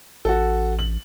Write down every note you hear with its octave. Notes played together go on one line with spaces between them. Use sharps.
A1 F#4 A4
F#7